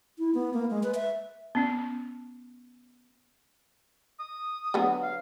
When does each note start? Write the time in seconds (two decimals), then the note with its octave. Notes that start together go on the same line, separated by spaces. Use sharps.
0.19 E4
0.34 B3
0.54 A#3
0.70 G#3
0.83 B4
0.95 E5
1.55 B3 C#4
4.20 D#6
4.74 D3 F#3 B3
5.02 F5